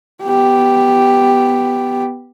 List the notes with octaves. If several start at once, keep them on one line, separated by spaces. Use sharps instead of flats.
B3 G4